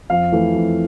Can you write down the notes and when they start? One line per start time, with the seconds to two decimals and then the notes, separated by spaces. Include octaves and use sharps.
0.10 F2 F5
0.32 E3 A3
0.54 F2